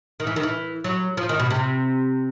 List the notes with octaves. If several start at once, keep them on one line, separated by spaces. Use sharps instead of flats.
D#3
E3
D#3
E3
F#3
F3
D#3
B2
C3